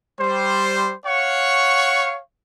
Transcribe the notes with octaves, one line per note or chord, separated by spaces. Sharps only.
G3 C5
C#5 F5 F#5 C#6